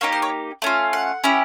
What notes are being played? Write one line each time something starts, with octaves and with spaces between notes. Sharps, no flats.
A#3 D#4 G4 C#5
C5
C#5
A3 C#4 F4
F#5
C#4 E4 G4